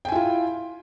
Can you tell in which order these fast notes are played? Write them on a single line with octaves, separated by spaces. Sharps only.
G5 G#5 E4 F4